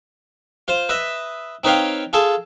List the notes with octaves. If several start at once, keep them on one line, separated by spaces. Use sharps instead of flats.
F4 C5
B4 D#5 E5
C4 D#4 B4 C#5 F5 G5
F4 G#4 A4